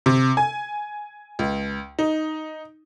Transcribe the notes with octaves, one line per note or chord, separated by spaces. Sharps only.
C3
G#5
C#2
D#4